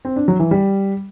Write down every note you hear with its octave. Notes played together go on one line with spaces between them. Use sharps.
C4
D4
F#3
E3
G3